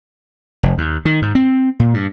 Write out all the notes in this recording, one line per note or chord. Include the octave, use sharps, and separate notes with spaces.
F1
D#2
D#3
G#2
C4
A#2
G2